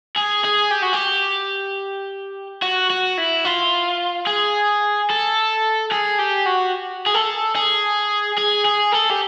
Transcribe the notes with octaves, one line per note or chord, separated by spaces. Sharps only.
G#4
G#4
G4
F#4
G4
F#4
F#4
E4
F4
G#4
A4
G#4
G4
F#4
G#4
A4
G#4
G#4
G#4
A4
G4